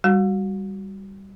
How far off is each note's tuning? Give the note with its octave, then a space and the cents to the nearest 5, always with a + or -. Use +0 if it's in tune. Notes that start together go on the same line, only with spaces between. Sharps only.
G3 +0 F#4 +0